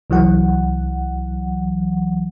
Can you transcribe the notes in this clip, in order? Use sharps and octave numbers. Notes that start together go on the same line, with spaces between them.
C2 E3 F#3 F#5